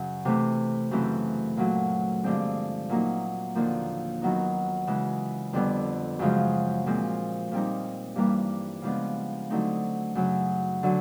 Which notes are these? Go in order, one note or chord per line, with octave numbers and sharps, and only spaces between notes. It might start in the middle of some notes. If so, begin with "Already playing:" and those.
Already playing: F#2 C#3 F#3
C3 E3 A3
F#2 C#3 E3 A3 C4
A#2 F#3 A3
G2 D3 F3 G#3 C4
A#2 F#3 A#3 D#4
D#2 D3 F3 A#3
D#3 F#3 B3 D#4
C#3 E3 G#3
F2 D3 G3 B3
F#2 C#3 F3 G#3
A#2 F3 G#3 C4
A#2 G3 C4 D#4
G2 E3 G3 A#3
C#3 F3 G#3 B3 D4
D3 F#3 A3 C4 D#4
F#2 C#3 F#3
D3 F#3